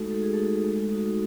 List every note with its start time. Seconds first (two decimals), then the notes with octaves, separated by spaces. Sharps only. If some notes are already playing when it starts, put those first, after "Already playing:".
Already playing: G#3 A3 D#4 F#4 A4
0.10 G#3 A4
0.22 G#4
0.34 A3 D#4 F#4 A4
0.65 G#3
0.92 D#4 F#4